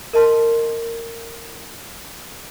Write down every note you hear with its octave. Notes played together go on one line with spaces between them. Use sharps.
A#4 D#5 A5 C6